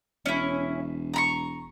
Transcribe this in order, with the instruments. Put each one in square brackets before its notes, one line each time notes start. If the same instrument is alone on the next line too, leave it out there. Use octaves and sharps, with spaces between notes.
[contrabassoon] E1 [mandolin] C#4 E4
[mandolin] A#5 B5 C#6